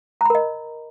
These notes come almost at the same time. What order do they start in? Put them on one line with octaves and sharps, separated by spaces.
A#5 B5 A#4 D#5